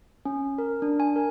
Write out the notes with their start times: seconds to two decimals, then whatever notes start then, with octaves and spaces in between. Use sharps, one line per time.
0.25 C#4
0.58 A#4
0.82 D4
1.00 G#5
1.16 A#4